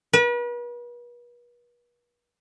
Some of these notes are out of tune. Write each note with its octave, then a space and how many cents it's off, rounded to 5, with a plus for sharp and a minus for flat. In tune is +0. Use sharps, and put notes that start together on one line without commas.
B4 -40